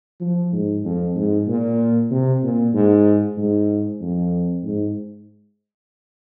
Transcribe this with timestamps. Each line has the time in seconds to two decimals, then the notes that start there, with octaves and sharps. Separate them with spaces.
0.20 F3
0.52 G#2
0.84 F2
1.16 G#2
1.48 A#2
2.11 C3
2.43 A#2
2.74 G#2
3.37 G#2
4.01 F2
4.64 G#2